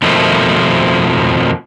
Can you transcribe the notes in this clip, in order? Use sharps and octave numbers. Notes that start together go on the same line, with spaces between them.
F2 B2 D#3 F3 A3